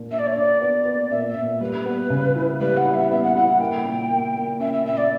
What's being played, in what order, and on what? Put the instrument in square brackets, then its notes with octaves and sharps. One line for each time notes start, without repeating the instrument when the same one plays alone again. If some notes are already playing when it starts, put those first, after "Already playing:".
Already playing: [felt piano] A#2 D4
[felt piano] D4 [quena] E5
[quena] D5
C#5
[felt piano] D4 [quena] D5
[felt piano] B3 [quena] D5
[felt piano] B3
[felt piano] A#2 [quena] E5
[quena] E5
[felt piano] A#2
[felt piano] G3 [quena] B4
[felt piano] B3
C#3
E4
[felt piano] G3 [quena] B4
[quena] F#5
[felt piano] E4
[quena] E5
[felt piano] B3 [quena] E5
[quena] F#5
[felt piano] E4 [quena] F#5
[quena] F#5
[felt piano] A#3 [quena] G5
[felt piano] A#2
A#3
A#3
[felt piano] C#4 [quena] E5
[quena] E5
[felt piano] A#2 [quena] E5
[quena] D5